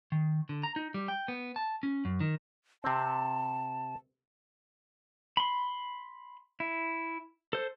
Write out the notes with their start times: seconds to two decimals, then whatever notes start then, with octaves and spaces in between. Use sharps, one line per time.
0.12 D#3
0.49 D3
0.63 A#5
0.76 D#4
0.94 G3
1.08 G5
1.28 B3
1.56 A5
1.83 C#4
2.05 F#2
2.20 D#3
2.84 C3 C4 A5
5.37 B5 C6
6.60 E4
7.53 A4 C5